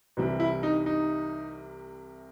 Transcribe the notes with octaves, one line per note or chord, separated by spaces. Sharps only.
C2 C3 E3 G3
E4
D#4
D#4